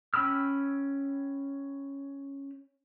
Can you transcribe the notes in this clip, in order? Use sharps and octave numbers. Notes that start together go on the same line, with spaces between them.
C#4 G5 B5 E6 F6